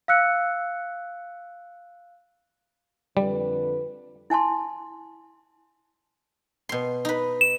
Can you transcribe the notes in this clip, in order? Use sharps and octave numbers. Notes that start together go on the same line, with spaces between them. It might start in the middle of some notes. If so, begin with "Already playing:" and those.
F5 E6 F#6 C#7
F2 D3 G3 B4
E4 G#5 A5 C6
B2 C6
D#4 B4
E7